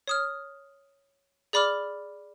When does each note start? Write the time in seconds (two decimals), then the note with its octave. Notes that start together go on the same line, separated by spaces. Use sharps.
0.08 C#5 D#6 F6
1.53 G#4 D5 B5 D6 F6